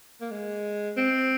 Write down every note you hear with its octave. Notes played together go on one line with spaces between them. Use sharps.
A#3
G#3
C4